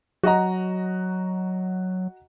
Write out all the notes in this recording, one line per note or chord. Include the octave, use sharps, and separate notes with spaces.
F#3 F#4 D#5 A#5